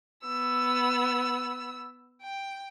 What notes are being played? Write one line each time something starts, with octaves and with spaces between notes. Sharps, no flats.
B3 E6
G5